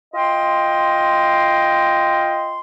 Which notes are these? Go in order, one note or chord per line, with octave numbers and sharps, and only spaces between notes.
F4 D#5 G5 C6